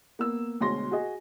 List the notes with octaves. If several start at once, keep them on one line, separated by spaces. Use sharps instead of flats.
A#3 B3 E6
D2 B2 G#3 C#5 C6 A#6
F#4 G#4 D#5